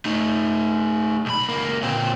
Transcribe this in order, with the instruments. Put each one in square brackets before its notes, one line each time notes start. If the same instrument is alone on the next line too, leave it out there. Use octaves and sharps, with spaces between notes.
[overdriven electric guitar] A3 D#4
B1 B5
C#2 A#3
A#2 C4